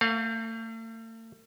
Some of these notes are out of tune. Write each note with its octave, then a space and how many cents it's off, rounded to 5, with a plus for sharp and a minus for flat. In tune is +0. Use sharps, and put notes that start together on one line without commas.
A3 +40 F5 +25